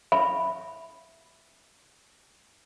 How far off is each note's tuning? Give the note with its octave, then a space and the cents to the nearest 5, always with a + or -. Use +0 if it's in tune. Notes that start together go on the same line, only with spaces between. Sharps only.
E5 +0 B5 +0